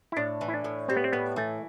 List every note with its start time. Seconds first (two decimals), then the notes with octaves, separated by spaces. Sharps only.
0.12 E4
0.17 A2 D4
0.41 E3
0.48 E4
0.54 D4
0.64 A2
0.88 G3 C4
0.97 B3
1.04 C4
1.12 A2 B3
1.36 E3 A3